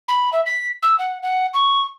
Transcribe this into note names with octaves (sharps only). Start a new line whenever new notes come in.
B5
E5
B6
E6
F#5
F#5
C#6